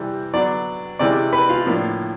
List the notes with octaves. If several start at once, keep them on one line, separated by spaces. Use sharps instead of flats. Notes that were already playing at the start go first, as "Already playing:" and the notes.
Already playing: C3 E3 G3
D3 F#3 B3 D4 D5
C3 E3 G#3 C#4 D5
B4
F4
A2 F3 A#3 D4